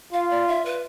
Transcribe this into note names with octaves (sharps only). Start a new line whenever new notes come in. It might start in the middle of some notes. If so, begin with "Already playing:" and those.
F4 F5
D5
E5
B4